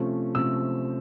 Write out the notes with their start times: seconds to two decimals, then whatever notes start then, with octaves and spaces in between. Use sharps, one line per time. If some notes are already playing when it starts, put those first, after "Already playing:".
Already playing: C3 F3 A3 C#4
0.35 C3 F3 A3 C#4 E6